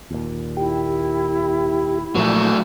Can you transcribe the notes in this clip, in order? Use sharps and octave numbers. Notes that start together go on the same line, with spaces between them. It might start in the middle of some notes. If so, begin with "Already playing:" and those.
D#2 A#2
E4 G4
A#2 F3 F#3 A3 A#3